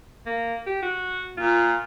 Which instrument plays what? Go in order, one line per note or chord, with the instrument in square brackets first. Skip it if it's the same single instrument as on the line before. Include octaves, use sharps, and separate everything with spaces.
[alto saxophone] A#3
G4
F#4
[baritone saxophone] A#2 [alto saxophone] F4